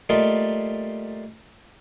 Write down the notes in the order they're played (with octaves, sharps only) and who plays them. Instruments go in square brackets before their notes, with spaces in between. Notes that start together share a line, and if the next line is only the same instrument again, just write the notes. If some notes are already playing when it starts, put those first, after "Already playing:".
[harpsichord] G3 A3 A#3 F4 D#5